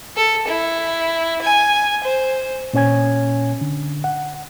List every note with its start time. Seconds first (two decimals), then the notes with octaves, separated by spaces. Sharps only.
0.17 A4
0.48 E4
1.42 G#5
2.04 C5
2.73 A#2 C#4 C#5 G#5 G#6
3.61 D3
4.04 F#5